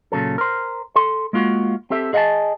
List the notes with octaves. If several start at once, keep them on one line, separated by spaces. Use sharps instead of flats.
A#2 C#3 F#3 A4
A#4 C5
A4 C6
G#3 A#3 F4 F#4
C4 G4 A4 E5
G#4 D#5 F5 F#5 G#5 A5